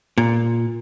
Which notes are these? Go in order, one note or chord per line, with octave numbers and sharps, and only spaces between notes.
A#2